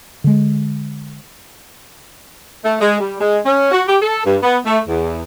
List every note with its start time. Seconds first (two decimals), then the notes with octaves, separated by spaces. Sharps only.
0.24 D3 G#3
2.65 A3
2.81 G#3
3.00 G3
3.21 G#3
3.46 C#4
3.72 F#4
3.88 G4
4.02 A4
4.26 G2
4.43 B3
4.65 A3
4.88 E2